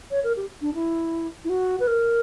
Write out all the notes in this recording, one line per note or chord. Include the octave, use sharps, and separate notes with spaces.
C#5
A#4
G4
D4
E4
E4
F#4
B4
A#4